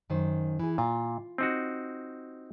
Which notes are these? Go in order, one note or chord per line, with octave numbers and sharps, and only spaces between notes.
F#2 D#3 C5
E3 G#4
A#2 F4
C4 D#4 F#4